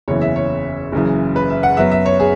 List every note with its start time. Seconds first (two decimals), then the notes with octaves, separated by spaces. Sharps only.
0.08 F#1 E2 C#3 E3 C#5
0.21 E5
0.36 C#5
0.92 F#1 F#2 C#3 E3
1.36 B4
1.50 E5
1.63 F#5
1.77 F#2 F#3 B3 E5
1.92 E5
2.06 C#5
2.20 G#4